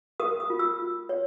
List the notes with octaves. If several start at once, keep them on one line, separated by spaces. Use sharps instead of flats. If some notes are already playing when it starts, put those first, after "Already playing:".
A#4 D#6
D#6
F4
E6
F4
C#5